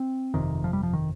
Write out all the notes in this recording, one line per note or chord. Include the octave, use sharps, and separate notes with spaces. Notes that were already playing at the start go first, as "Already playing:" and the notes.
Already playing: C4
G1 F2 C3 D#3
F3
G3
F3
D#3